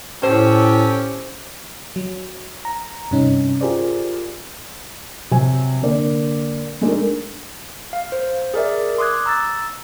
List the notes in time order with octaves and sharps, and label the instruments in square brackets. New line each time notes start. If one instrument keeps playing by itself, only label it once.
[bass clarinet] A2 [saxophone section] C#4 G4 [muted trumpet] A4 [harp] C5
[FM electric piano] F#3
A#5
G2 C3 C#4 D#4
F4 G4 G#4 A#4 C5 D5
[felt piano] C3 F#3 G#5
D3 A#3 D5
G#3 A3 D4 D#4 G#4 A#4
[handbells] F5
C5
G#4 A#4 D5 E5
C6 D6 D#6 F#6 G#6
A#5 E6 A6